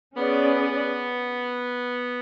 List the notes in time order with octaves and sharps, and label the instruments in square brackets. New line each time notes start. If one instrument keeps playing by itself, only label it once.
[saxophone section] B3 [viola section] C#4 G#4 B4 D5